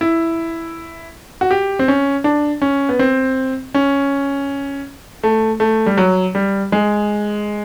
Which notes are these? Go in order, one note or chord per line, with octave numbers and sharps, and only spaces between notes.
E4
F#4
G4
C4
C#4
D4
C#4
B3
C4
C#4
A3
A3
G3
F#3
G3
G#3